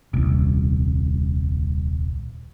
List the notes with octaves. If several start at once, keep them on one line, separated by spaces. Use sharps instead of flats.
D#1 C2